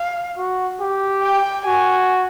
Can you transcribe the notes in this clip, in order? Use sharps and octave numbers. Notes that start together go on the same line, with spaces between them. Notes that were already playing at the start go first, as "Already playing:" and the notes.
Already playing: F5
F#4
G4
G5
F#4 G#5